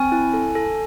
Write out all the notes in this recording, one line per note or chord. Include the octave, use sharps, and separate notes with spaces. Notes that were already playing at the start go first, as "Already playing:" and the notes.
Already playing: C4 G#5
E4
A4
A4